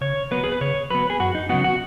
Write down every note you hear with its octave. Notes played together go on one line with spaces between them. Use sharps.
C#3 C#5
F#3 B3 B4
G#4
B4
C#3 C#5
F#3 B3 B4
G#4
F#2 F#4
D#4
C#3 F#3 B3 F#4
F#4